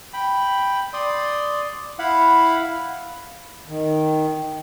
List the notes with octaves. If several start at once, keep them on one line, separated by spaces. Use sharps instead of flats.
G5 B5
D5 C6 D#6
E4 F5 F#5 B5
D#3